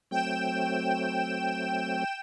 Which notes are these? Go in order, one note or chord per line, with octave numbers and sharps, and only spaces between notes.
F#3 A3 C4 G5 E7